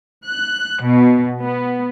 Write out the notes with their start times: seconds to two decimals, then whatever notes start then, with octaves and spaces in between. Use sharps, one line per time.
0.25 F#6
0.84 B2
1.43 B3